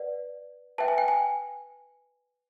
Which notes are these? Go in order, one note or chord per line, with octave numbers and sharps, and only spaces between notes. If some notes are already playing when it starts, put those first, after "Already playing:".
Already playing: B4 D5 F#5
B4 E5 G5 A5
G#5
G5
G#5